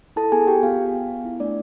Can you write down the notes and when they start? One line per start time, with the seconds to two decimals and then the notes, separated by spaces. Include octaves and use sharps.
0.16 E4 A4 A5
0.32 B3 G#4 G#5
0.47 B3 G4 G5
0.63 B3 F4 F5
0.78 B3
0.94 B3
1.09 B3
1.25 E4
1.40 A3 D4 D5